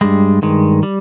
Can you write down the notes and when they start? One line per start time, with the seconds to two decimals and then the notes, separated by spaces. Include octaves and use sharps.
0.01 G2 G3 G#3
0.42 G2 D#3 G#3
0.83 G3